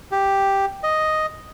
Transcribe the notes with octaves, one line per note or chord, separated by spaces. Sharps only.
G4
D#5